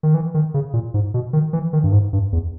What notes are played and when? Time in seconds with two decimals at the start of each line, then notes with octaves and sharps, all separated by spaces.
0.03 D#3
0.14 E3
0.34 D#3
0.54 C#3
0.74 A#2
0.94 G#2
1.14 B2
1.33 D#3
1.53 E3
1.73 D#3
1.84 G2
1.92 G#2
2.13 G2
2.32 E2